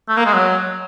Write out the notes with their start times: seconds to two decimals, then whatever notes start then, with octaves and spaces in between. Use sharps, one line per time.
0.09 A3
0.17 A#3
0.26 G#3
0.34 F#3